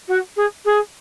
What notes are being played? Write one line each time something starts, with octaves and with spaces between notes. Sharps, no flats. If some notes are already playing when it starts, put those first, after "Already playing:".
F#4
G#4
G#4